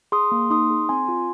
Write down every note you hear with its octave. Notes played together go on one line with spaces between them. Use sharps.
G#4 C6 D#6
A#3
D#4 C6 D#6
G#4
C4 G#5 C6
F4